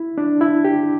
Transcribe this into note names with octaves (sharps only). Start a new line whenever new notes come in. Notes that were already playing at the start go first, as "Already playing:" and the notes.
Already playing: E4
D4
E4
G4